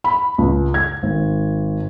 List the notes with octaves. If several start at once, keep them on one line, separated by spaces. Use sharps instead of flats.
B5
C#2
G#6
G#1